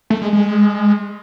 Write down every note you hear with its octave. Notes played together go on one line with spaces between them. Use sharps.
A3
G#3
G#3